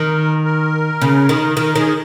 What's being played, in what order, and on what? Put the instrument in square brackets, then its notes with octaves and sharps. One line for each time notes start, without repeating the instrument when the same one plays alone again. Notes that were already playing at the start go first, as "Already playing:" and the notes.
Already playing: [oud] D#3 [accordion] A#4
[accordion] A#4
[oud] C#3
D#3
[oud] D#3 [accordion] A#4
[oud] D#3 [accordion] G#4